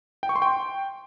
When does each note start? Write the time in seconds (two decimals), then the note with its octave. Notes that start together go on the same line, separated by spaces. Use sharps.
0.23 G5
0.29 C#6
0.36 C6
0.42 G5